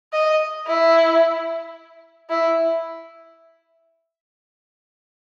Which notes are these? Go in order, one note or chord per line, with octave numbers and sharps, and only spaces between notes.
D#5
E4
E4